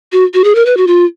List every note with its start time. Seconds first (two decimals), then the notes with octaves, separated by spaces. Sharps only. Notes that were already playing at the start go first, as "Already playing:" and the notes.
0.12 F#4
0.34 F#4
0.44 G#4
0.55 A#4
0.66 B4
0.77 F#4
0.87 F4